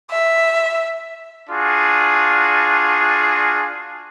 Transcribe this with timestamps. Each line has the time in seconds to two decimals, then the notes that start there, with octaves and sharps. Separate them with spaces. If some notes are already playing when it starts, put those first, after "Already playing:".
0.10 E5
1.50 D4 F4 F#4 G#4